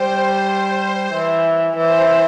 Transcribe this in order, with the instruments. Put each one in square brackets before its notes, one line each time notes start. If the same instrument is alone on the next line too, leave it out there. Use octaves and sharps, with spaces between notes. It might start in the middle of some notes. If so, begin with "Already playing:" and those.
Already playing: [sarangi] G3 [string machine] C5
[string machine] C5
[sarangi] E3
[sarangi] E3 [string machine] C5